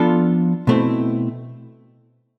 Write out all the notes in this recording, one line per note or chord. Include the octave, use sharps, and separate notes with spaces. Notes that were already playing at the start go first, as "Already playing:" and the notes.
Already playing: F3 B3 D4 F4 A4
B2 A3 C4 E4